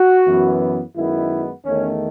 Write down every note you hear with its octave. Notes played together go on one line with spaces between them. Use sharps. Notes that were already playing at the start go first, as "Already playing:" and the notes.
Already playing: F#4
F#2 E3 B3
F#2 D#3 G#3 B3 E4
E2 D#3 A3 C#4